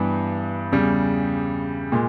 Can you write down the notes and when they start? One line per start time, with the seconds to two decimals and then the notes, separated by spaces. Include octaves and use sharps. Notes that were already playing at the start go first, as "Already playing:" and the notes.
Already playing: G2 E3 G3 B3
0.72 E2 C#3 G3
1.92 A#2 G#3